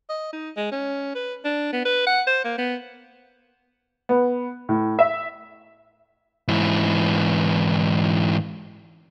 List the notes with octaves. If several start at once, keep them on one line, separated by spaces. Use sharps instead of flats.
D#5
D#4
G#3
C#4
B4
D4
B3
B4
F#5
C5
A#3
B3
B3
A2
E5
G#2 E3